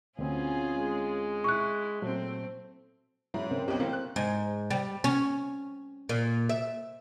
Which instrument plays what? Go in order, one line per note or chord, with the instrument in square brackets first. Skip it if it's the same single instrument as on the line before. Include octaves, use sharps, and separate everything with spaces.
[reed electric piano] D2 C4 [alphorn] B2 [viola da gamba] C#4 F4 G#4
[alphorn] G#3
[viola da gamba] E4 [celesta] C#6 F#6
[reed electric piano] A#2 F#3 [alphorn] A3 [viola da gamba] C4
[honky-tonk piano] G#2 [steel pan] F#3 E4
[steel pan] C#3 C4 A#4
[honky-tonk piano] B1 F2 [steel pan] G4
[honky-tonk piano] E3 A3 A#3 [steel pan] C4
[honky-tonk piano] F#6
[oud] G#2
G3
C#4
A#2
E5